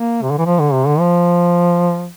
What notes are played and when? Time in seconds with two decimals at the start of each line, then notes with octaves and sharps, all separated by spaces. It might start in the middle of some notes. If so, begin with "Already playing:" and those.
Already playing: A#3
0.22 C3
0.30 D3
0.38 E3
0.46 F3
0.60 D3
0.73 C3
0.87 D3
1.00 F3